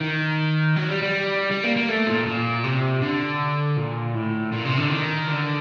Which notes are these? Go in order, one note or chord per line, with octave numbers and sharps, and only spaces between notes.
D#3
F#3
G3
G3
G3
A#3
A#3
A3
A#2
A#2
C3
D3
A#2
A2
A#2
C3
D3
D#3
D3